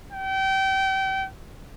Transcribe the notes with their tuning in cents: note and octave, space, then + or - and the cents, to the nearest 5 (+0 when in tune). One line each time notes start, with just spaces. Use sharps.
G5 -30